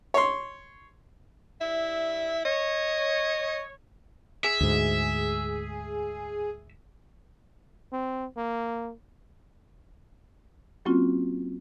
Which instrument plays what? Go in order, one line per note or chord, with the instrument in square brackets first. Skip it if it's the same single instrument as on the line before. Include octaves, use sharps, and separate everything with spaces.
[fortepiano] C#5 C6
[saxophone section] G2 E4 [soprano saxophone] E5
[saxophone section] C#5 [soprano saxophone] D#5
[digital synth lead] G#4 [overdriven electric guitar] E5
[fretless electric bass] D2 G#2
[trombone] C4
A#3
[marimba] F#3 A#3 C4 C#4 F4 F#4